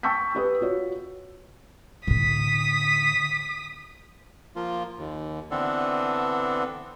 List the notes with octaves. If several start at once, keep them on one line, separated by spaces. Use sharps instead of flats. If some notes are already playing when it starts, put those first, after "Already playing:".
G5 A5 C#6 E6 G6 B6
G4 B4 D#6
F4 F#4 C#5
A2 D3 D#6 B6
F3 A#3 F4
D#2
D3 E3 B3 C4 D4 A4